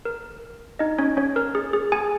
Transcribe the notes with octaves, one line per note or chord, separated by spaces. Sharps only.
A#4
D#4 D#5
C#4 C#5
C#4 C#5
A#4
G#4
G#4
G#4 G#5